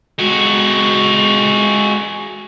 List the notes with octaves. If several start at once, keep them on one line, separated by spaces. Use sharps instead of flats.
G#3 F#4